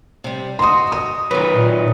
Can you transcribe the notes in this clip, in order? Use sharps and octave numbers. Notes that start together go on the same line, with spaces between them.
C3 G3
F#4 D#5 C6 D#6
D#6
D#3 F#3 D#4 A#4 B4
A#2